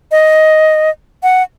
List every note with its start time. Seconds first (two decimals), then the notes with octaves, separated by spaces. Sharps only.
0.11 D#5
1.23 F#5